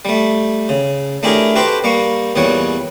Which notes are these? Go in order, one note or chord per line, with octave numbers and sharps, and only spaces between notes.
G3 A3
C#3
A3 D4 E4 G4 G#4 A#4
F#4 G4 A4 B4 C5 G5
G3 A#3 C#6
E2 A#2 G3 C#5 F#5